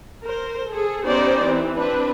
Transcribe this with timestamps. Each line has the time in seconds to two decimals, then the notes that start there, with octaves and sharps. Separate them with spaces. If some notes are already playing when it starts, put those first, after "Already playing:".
0.24 A#4 C5
0.68 G#4 A4
1.04 B3 C#4 D#4 G4 C5 D5
1.45 E3 C4
1.77 C4 D4 B4